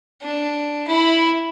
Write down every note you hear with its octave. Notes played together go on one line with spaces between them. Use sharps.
D4
E4 B5